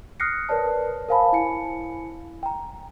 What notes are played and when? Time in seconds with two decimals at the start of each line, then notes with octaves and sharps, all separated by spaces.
0.20 D#6 F6 F#6 A#6 C7 C#7
0.49 A#4 B4 C#5 D5 A5
1.09 A#4 C5 F5 G#5 A5 B5
1.33 E4 G#5 C#7
2.43 G5 A#5